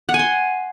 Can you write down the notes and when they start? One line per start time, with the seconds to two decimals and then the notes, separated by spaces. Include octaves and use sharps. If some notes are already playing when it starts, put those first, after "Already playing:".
0.09 F#5
0.14 G#5
0.19 C6